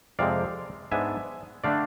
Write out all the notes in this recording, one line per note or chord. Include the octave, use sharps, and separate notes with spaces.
F2 C3 F3 G#3 C4 D5 F5
G#2 G#3 B3 D4 E5 G#5
D3 A3 D4 D5 F5